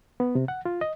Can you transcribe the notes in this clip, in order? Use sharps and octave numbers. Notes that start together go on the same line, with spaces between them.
B3
C3
F#5
F4
D#5